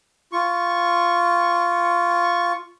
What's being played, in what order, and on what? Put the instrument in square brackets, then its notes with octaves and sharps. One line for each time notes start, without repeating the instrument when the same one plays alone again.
[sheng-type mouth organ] F4 C#6